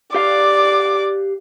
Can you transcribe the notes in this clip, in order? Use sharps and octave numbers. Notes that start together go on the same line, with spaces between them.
G4 D5 F5 D6